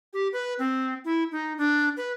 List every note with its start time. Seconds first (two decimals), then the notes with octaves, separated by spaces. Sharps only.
0.13 G4
0.33 B4
0.59 C4
1.05 E4
1.32 D#4
1.58 D4
1.97 B4